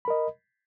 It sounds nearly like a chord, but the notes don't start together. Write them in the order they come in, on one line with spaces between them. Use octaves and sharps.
B5 A#4 D#5